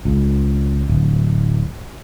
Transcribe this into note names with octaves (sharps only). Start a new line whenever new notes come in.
C#2
D1